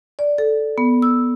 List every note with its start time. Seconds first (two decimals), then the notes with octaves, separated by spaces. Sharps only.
0.19 D5
0.38 A4
0.78 B3
1.02 E6